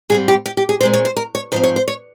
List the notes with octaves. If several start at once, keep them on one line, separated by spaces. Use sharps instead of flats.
G#2 G3 C4 G#4
G4
G4
G4
G#4
A#2 G#3 C4 C5
C#5
C5
A#4
C#5
G#2 F3 C4 C5
C#5
C5
C#5